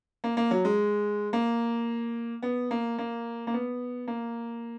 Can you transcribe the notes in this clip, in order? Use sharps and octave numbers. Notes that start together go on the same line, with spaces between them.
A#3
A#3
F#3
G#3
A#3
B3
A#3
A#3
A#3
B3
A#3